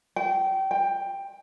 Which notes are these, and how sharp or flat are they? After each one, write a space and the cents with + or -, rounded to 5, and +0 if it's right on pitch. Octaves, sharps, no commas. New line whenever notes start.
G5 -25
G5 +10